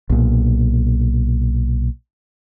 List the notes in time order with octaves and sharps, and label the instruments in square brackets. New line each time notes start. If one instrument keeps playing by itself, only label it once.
[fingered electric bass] B1 A#2